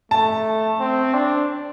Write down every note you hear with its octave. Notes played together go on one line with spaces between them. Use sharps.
A3 A5
C4
D4